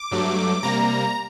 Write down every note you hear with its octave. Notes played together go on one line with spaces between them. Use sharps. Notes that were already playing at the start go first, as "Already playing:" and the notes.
Already playing: D6
G2 F#3 A3
C3 G3 A#3 A#5